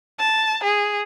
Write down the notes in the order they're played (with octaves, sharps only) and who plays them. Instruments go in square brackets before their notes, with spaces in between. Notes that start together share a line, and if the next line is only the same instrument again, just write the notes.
[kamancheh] A5
G#4